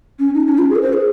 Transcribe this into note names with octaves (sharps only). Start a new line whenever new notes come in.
C#4
D#4
C#4
F4
G#4
A#4
C5
G#4